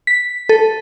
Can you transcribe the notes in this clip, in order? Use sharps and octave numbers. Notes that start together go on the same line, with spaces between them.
B6
A4